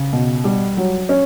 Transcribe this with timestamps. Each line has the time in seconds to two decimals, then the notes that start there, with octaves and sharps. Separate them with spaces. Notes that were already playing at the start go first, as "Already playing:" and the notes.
Already playing: C#3
0.13 B2
0.44 G3
0.77 F#3
1.09 C#4